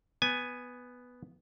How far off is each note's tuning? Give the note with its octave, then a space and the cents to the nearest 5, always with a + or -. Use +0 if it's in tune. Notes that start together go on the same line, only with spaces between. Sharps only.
B3 +0 G#5 +0